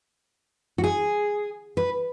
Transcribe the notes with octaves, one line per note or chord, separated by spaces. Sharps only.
F#4
G#4
B4